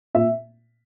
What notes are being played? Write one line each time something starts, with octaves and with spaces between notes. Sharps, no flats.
A#2 E5